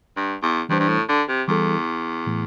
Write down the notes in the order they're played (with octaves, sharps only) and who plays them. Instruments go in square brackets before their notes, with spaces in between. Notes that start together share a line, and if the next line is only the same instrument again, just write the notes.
[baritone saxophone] G2
E2
[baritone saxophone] G2 [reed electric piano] E3 G3 D4 C5
[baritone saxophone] G2
A2
D3
C3
[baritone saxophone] E2 [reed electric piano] E3 G3 E4 A4
[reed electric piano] A2 E3 A3